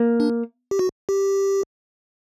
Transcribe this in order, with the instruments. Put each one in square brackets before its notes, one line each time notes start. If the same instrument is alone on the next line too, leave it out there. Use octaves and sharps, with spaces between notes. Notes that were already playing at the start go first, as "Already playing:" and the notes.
Already playing: [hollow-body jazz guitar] A#3
[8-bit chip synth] D4
G4
F#4
G4